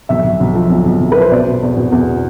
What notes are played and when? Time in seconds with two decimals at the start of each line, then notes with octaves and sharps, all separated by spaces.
0.09 B1 E5
0.24 B1
0.40 B1
0.55 F3
0.70 B1
0.85 B1
1.00 B1
1.12 F3 B4
1.22 C5
1.32 B2 D5
1.47 B2
1.62 E2
1.77 B2
1.92 E2